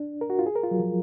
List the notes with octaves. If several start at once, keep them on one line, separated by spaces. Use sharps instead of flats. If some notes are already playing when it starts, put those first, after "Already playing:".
Already playing: D4
A#4
F#4
F4
G#4
A#4
F4
F#3
F3